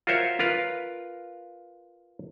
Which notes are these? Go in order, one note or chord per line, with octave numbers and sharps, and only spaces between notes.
F4 F#4 A#4 C5 C#5 E5
F4 A#4 B4 F5